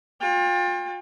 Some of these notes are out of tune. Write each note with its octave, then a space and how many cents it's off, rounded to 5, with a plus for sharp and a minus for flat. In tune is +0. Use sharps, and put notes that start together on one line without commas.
F4 +35 G5 +40